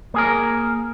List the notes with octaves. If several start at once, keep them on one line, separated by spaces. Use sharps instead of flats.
A#3 G#4 A#4